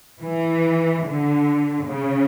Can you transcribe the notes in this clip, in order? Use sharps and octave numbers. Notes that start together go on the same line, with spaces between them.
E3
D3
C#3